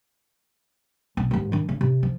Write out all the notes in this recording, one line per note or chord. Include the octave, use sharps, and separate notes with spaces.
B1
D#2 G#2
D#3 D4
C#3
C3
F3